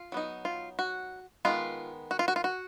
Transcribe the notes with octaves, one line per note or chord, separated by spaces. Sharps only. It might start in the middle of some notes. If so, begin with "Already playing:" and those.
Already playing: F4
F#3 B3 D#4
F4
F#4
D#3 G#3 B3 F4
F#4
F4
F#4
F4
F#4